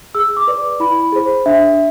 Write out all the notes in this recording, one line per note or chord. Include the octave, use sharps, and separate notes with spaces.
G#4 E6
D6
B4 D5
D6
E4 B5
G#4 C5
D4 E5